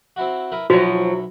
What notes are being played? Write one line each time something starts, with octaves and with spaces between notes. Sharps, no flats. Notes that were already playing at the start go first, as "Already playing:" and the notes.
C4 E4 F#4
E4 A#4 B4
B1 F3 F#3 E4 F#4